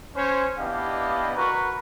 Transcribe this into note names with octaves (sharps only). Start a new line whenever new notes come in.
C#4 C5 C#5
B3 D4 E4 G4 D#5 F5
F#4 A#4 B4 A#5 C#6